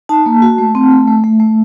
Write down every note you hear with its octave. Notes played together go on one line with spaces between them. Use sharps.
D#4 A5
A#3
F#4
A3
C4
A3
A3
A3
A3